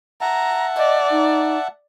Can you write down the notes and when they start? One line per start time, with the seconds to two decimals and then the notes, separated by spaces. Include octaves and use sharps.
0.21 E5 F#5 A5 A#5
0.77 D5 D#5
1.11 D#4